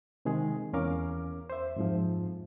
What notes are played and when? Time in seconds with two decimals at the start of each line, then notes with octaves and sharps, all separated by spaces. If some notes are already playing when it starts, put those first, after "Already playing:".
0.25 C3 D#3 G#3 G#4
0.73 E2 C#4 A#4 F5 D6
1.50 C5 E5
1.76 F2 G#2 F3